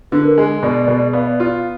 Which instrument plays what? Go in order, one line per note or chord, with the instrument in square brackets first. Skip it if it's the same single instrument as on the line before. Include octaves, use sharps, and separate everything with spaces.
[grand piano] D3 [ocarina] B4
[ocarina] A#4
[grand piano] G#3
[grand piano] B2 [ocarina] D5
[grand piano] B2 [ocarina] D5
[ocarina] D5
[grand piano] B3 [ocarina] F5
[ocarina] D5
[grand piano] F4